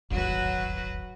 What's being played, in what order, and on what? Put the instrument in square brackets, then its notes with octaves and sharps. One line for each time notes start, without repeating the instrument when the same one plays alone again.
[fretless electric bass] D1 G1 D#2 [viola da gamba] F#3 F#4 B4